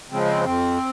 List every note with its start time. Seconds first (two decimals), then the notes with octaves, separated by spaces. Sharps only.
0.11 C#3 F3 G#3 C4
0.25 C4
0.45 F2 C4